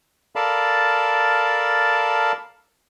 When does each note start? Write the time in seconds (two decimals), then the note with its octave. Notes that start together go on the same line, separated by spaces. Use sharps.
0.36 A4 A#4 D5 F5 A5 B5